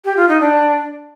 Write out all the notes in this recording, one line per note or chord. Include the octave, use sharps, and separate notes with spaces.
G4
F4
D#4
D4